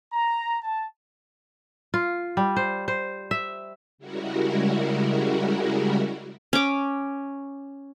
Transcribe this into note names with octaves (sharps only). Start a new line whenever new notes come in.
A#5
A5
F4
G3
C5
C5
E5
C#3 G3 G#3 E4 F#4 A#4
C#4 D6